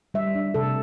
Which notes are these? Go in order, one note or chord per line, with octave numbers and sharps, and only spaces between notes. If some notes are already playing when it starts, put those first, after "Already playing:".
G3 E5
D4
C3 A4